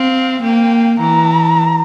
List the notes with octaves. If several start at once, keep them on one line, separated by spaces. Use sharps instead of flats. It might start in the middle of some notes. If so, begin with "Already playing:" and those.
Already playing: C4 F5
A#3 G5
E3 A#5